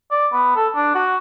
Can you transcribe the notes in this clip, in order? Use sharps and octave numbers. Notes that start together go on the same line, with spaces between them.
D5
B3
A4
D4
F#4